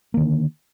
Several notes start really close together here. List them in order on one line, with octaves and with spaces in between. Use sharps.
A#3 D#3 D3